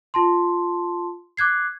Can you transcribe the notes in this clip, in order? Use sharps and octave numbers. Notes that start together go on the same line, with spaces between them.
F4 A5 C6
D6 F#6 G#6 C7